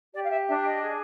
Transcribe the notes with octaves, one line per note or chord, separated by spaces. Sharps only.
G4 D5
F5
E5
D4 E5
D#5
G#4